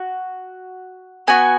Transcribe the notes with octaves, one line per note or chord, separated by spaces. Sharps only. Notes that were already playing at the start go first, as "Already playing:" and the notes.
Already playing: F#4
B3 F#4 G#5